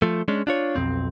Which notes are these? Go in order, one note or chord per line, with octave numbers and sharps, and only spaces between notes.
F3 A3
G#3 C#4 D4
D4 F4 C#5
B1 F2 C4